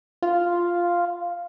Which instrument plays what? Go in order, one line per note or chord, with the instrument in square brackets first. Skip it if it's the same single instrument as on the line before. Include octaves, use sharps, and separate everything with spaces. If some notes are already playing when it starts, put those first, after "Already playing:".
[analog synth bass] F4